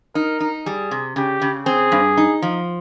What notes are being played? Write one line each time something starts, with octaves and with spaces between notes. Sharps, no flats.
D#4 A#4
D#4
G3 G#4
C3
C#3 G4
C#3
C4 G#4
G2
D#4
F3